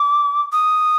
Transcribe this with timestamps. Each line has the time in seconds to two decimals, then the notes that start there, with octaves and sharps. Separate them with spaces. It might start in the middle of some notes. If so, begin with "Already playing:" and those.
Already playing: D6
0.53 D#6